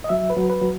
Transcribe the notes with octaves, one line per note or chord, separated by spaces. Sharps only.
D#5
F#3 E5
B4
F#3
B4
F#3